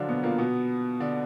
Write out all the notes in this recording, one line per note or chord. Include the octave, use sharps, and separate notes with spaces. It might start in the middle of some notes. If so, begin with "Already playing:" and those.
Already playing: D3 F3 F#3 D4 F4
B2 B3
A#2 A#3
B2 B3
D3 D4